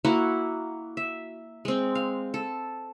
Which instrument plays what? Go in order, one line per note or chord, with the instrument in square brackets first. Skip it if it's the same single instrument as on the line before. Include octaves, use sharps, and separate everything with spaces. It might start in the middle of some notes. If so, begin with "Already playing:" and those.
[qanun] A#3 E4 F#4
E5
G#3 C4
F5
A4